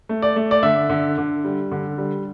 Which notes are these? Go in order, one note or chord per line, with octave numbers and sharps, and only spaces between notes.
A3
D5
A3
D5
D3 E5
D3
D3
G3
D3
G3